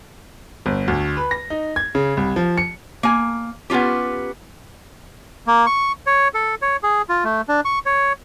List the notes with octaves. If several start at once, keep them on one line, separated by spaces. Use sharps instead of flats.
G1
D2
B4
A#6
D#4
G#6
C#3
C2
F3
C#7
A#3 G#5
B3 C#4 D#4 F4 G4
A#3
C#6
C#5
A4
C#5
G#4
F4
A3
D4
C#6
C#5